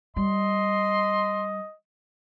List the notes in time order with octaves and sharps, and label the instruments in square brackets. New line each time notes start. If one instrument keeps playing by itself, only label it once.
[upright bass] G3 [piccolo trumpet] D#5 [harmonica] C6